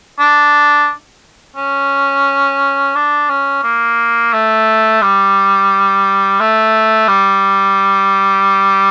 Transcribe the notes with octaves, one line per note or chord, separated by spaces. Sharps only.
D4
C#4
D4
C#4
A#3
A3
G3
A3
G3